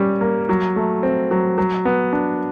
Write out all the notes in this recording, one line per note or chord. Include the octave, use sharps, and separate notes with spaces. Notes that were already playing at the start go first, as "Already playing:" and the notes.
Already playing: G3 C#4
A#3
F#3
A3
C4
F#3
F#3
B3
D4